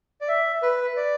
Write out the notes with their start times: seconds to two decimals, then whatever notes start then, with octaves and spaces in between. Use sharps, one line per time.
0.21 D5
0.28 E5
0.62 B4
0.96 D5